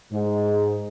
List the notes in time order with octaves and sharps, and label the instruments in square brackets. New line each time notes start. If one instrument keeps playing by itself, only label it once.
[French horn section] G#2